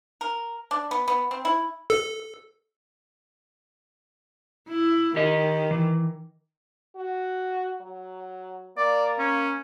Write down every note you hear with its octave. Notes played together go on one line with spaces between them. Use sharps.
A#4
D4
B3
B3
C4
E4
A4
E4
D#3 G4 D#5
E3
F#4
F#3
A#3 D5
C#4